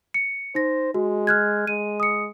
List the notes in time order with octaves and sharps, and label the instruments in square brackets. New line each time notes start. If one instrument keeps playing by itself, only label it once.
[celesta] C#7
[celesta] D#4 A#6 [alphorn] C5
[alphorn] G#3 [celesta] F#4
[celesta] F6 F#6 G#6
[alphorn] G#3 [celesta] D#7
[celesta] D#6 C#7